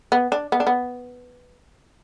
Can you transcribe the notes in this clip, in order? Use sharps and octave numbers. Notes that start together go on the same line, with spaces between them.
B3
D4
B3
D4
B3